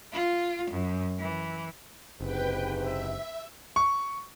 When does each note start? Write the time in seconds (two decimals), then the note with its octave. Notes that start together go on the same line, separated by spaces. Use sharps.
0.13 F4
0.71 F#2
1.19 E3
2.21 F#1 G#2 C3 B4 G5
2.79 E5
3.76 C#6